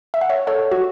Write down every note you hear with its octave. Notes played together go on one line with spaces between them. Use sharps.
E5
F#5
C#5 E5
A4 C#5
F#4